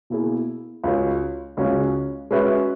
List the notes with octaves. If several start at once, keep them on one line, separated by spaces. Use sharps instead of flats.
B2 A#3 E4 G#4
C#2 C#3 G#3 C#4 F#4
C#2 C#3 G#3 C#4 F#4
G#3 C#4 F#4 B4 E5